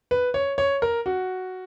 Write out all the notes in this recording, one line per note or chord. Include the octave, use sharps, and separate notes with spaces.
B4
C#5
C#5
A#4
F#4